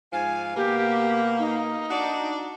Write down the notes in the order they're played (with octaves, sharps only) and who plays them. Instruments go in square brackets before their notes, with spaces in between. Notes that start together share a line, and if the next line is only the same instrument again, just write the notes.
[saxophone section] G#2 F3 F5 [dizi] G#5
[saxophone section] B2 A#3 [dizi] G4
[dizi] D#4
[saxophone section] D4 F#4 D5